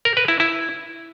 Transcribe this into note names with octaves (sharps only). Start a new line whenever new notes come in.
A#4
B4
E4
E4